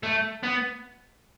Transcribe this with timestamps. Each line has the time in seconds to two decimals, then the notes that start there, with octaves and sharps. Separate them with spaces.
0.03 A3
0.43 B3